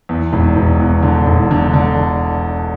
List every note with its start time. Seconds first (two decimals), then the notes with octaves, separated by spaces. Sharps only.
0.09 E2
0.33 E1
0.56 E1
0.80 E2
1.02 D3
1.26 E1
1.51 D3
1.74 D3